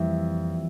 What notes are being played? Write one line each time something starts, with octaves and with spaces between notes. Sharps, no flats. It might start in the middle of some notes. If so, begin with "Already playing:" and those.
Already playing: F2 E3 G3 A#3 E5